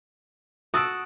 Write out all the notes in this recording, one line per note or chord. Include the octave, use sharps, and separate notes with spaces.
F#4 A5 D#6 E6 D7